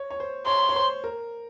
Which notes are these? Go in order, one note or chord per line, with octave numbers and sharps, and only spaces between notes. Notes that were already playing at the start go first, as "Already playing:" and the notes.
Already playing: C#5
C#5
C5
C#5 C6
C#5
C5
A#4